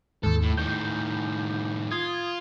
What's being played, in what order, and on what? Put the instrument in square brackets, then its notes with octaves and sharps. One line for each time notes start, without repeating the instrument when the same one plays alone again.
[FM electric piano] D#2 G#2 [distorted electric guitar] A4
[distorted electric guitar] A2
[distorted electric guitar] A2 D#3 [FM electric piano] G6
[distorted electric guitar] F4 [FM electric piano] D#6 G#6